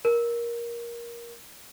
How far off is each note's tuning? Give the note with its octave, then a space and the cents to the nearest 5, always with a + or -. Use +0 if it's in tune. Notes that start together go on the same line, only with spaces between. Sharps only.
A#4 +15